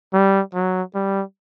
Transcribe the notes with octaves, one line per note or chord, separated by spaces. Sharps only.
G3
F#3
G3